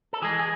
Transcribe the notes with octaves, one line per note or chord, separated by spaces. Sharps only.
A4
E3 G#3 G#4
G#4